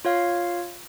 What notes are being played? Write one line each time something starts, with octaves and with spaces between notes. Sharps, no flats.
F4 C#5 F5